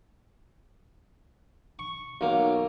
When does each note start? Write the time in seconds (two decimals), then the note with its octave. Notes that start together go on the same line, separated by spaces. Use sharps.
1.79 C#6
2.21 B1 A#3